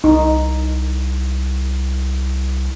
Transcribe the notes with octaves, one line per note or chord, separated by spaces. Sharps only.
C2 D#4